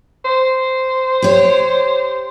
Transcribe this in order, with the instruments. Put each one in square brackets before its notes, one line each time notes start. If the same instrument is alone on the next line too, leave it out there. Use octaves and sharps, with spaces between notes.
[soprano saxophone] C5
[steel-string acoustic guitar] G4 C#5